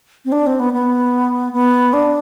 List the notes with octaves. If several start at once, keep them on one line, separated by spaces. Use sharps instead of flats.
C4
D4
C4
B3
B3
B3
D4